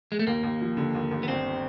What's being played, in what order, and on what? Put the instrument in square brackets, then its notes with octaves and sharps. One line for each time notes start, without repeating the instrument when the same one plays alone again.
[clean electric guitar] G#3
A3
[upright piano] D#2 [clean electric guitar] A#3
[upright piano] D#2
F3
D3
D#2
D#2
[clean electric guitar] B3
[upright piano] G1 [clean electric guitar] C4